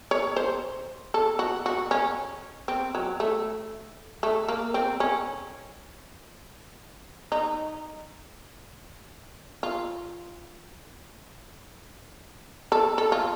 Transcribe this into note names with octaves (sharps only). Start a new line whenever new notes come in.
C#5
C5
A4
F#4
F#4
C#4
C4
F#3
A3
A3
A#3
C4
C#4
D#4
F4
A4
A4
F4